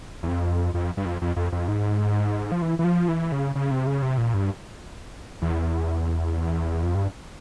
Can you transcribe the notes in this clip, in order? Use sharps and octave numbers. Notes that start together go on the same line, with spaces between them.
E2
F2
F2
G2
F2
F2
F2
F2
G#2
F3
E3
E3
F3
E3
C#3
C#3
C3
C#3
C3
A#2
G2
E2
F2
G2